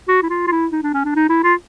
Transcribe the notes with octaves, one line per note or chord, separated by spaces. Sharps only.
F#4
E4
F4
F4
E4
D#4
D4
C#4
D4
D#4
E4
F4